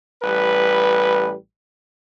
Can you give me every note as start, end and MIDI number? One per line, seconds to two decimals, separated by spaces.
0.23 1.34 33
0.23 1.34 55
0.23 1.34 71